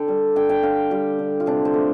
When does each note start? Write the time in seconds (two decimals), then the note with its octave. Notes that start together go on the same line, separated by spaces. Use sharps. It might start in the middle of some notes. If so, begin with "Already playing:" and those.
Already playing: D3 G5
0.08 G3
0.36 D3 G5
0.49 G5
0.63 D3 F5
0.91 G3 G4
1.19 D3
1.40 F4
1.46 C3 D4
1.65 C5
1.74 A3